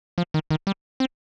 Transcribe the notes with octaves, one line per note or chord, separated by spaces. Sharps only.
F3
D#3
D#3
G3
C4